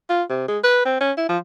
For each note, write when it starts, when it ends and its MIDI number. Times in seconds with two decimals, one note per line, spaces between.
0.10 0.23 65
0.30 0.45 48
0.48 0.59 56
0.64 0.83 71
0.86 0.99 60
1.01 1.12 61
1.17 1.26 64
1.29 1.38 53